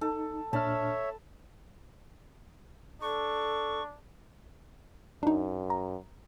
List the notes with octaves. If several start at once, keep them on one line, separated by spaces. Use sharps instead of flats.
D#4 A4
A#2 D4 C#5 E5 A5 B5 F6
D4 A4 C#6
F#2 D4 D#4
A#5